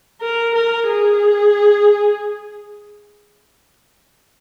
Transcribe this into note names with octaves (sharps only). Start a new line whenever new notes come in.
A#4
A#4
G#4